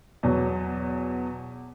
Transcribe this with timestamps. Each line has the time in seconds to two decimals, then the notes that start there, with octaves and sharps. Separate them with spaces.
0.23 E2 B2 F#3